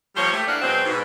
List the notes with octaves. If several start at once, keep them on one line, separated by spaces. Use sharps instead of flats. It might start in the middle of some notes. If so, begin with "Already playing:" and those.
F3 G3 A#3 C5 C#5
A3 G4
A2 E3 A#3 D4 F5 F#5
B2 F#3 G#3 C4
G#2 B2